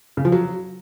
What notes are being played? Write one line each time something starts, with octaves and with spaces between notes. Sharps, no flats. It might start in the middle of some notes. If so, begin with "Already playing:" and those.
C#3
F3
F#3